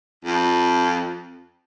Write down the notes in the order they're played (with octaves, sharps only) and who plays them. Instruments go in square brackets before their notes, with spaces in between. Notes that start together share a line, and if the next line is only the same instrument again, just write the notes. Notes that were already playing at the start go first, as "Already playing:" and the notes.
[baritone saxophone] F2